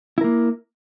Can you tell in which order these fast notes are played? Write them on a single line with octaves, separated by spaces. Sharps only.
E4 A#4 A#3